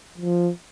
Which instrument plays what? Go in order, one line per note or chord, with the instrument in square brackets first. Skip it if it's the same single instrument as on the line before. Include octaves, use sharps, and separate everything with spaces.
[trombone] F3